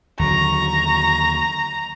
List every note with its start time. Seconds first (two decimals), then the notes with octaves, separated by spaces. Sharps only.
0.19 D#2 D3 F#3 A#5 C#6